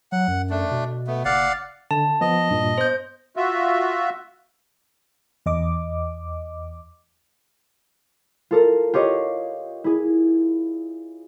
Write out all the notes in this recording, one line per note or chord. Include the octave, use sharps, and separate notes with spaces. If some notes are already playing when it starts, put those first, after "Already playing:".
F#3 F#5
F#2
A3 D4
B2
A3 B3
F#1 D5 F5 F#5
D3 A5
F3 B3 D#5
G2 A#2
B3 C5 G6
F4 F#4 E5
E2 D#5 D6
F4 A4 A#4
F4 G4 C#5 D#5
E4 G#4